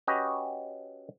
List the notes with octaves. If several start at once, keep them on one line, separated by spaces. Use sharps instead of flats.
C#4 F#4 G4 B4 D#5